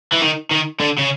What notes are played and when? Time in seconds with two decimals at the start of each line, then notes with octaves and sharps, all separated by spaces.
0.13 E3
0.22 D#3
0.51 D#3
0.80 D3
0.98 C#3